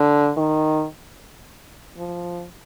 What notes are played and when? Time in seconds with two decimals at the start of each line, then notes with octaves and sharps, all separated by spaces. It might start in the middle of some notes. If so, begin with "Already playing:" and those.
Already playing: D3
0.37 D#3
1.98 F3